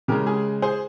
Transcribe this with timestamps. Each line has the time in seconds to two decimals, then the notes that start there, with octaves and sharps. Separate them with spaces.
0.08 C#3 G#3 G4 A#4
0.26 G#4
0.62 G#4 C5